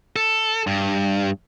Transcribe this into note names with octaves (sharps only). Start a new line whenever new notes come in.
A4
G2